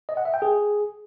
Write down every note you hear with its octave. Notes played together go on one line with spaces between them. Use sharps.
D#5
F#5
E5
G5
G#4